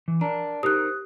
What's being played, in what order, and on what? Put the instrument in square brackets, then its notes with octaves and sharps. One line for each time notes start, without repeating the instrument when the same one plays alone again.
[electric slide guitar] E3
[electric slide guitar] D4 A#4 [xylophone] A#5
[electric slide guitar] D#4 A#4 C5 [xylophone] G4 [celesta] D#6 F#6